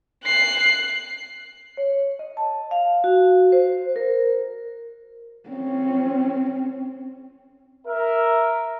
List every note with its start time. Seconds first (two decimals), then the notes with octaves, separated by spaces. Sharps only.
0.25 F#6 C7
1.77 C#5
2.19 D#5
2.37 A5
2.71 F5
3.04 F#4
3.52 C5
3.96 A#4
5.49 C4 C#4
7.87 A#4 E5